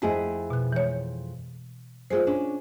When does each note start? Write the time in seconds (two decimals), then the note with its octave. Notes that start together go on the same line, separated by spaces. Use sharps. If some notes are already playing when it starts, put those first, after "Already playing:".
0.02 F2 A3 E4 G#4 D#5
0.50 B2 F#6
0.72 E3 G#3 C#5
2.10 G#3 A3 F4 G#4 C5
2.27 C#4 D4